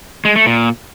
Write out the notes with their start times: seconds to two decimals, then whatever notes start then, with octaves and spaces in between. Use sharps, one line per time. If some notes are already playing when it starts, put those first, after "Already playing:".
0.25 G#3
0.36 A3
0.46 A#2